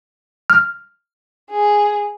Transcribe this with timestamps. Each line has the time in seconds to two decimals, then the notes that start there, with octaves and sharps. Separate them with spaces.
0.50 F6
1.50 G#4